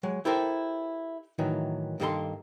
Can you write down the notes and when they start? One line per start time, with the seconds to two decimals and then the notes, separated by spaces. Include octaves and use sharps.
0.03 F#3 G#3
0.25 E4 G4 A4 A#4 C5
1.38 A2 D#3 E3 F#3
2.00 G2 D#3 A#3 A4 A#5 C6